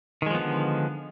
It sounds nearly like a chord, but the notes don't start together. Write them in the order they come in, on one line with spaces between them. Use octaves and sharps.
D#3 G#3 F3 B3 D3